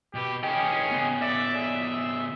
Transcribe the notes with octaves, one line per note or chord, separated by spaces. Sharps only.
B2 G4 B4
C#4 G4 G#4 D#5 G5
C#3 B3
D5 E5
G#4